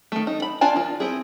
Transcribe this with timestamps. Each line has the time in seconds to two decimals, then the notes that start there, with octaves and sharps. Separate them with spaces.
0.12 D#3 A3
0.27 D#4
0.42 B5
0.61 D4 F4 G#5 A5
0.76 D#3 F4
1.00 C4 E4 G#4